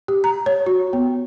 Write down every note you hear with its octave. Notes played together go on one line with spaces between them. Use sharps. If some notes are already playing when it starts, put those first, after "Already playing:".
G4
A#5
C#5
F#4
B3